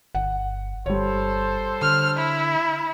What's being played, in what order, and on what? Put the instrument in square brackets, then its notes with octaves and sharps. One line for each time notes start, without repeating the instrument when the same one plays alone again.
[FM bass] G1 [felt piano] F#5
[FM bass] G1 [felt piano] G3 C#5 [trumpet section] A4 C5
[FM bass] D3 [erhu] F6
[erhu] E4